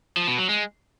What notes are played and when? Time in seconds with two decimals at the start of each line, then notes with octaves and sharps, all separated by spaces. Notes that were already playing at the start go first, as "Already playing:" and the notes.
0.17 F3
0.27 B2
0.38 F#3
0.49 G#3